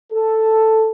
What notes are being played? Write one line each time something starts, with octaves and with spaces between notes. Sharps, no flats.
A4